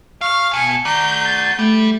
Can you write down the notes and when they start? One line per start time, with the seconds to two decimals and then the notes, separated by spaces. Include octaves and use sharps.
0.21 F5 C#6 F6
0.53 B2 G#5 C#7
0.85 F#4 D5 A#5 G6
1.26 A6
1.59 G3 A3